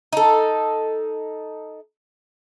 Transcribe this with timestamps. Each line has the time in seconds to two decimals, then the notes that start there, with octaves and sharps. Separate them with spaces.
0.13 D#4 A4